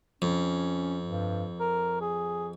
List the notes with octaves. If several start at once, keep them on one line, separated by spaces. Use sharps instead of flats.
F2 C#4
G2
A#4
G#4